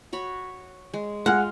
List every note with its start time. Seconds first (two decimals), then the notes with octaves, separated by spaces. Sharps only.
0.13 F#4 C#5 B5
0.94 G#3
1.26 G#3 F4 F#5 F6